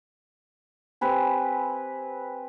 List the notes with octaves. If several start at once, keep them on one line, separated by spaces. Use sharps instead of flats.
C4 G4 B4 G#5